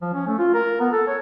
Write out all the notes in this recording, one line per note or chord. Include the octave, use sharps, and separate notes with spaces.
F3
C#4
A3
F4
A#4
B3
A4
C#5